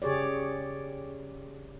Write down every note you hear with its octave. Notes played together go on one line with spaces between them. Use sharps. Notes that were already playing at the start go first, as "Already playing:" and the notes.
C#3 G4 G#4 C#5 D5